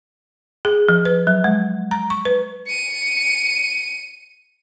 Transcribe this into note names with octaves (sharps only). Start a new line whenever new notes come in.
G#4
F3
B4
F#3
G#3
A#5
C#6
B4
C#7 D#7